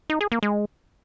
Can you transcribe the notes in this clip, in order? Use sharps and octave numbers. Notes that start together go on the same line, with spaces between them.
D#4
G#4
A#3
G#3